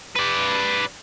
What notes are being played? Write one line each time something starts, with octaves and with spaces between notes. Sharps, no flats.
B4 D5